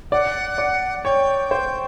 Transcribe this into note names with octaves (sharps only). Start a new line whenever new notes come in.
D5 F#5
D5
C#5 G5
C5